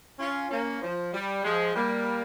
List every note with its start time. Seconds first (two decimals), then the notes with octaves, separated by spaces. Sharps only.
0.19 C#4 F4
0.50 A#3 C#4
0.82 F3
1.13 G3
1.44 F3 G#3
1.75 G3 A#3